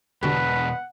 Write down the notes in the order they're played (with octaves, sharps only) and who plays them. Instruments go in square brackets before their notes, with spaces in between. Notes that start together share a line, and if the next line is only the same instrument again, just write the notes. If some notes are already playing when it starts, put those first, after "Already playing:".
[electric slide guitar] E2 B2 D4 [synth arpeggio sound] D3 F#4 G4 [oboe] B4 [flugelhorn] F#5